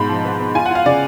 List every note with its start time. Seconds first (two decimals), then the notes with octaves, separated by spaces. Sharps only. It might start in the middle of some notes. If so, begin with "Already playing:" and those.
Already playing: G#2 B2 B5
0.09 F3
0.24 B3
0.39 B3
0.55 F4 G#5
0.66 F#5
0.71 F4 F5
0.86 C#3 D5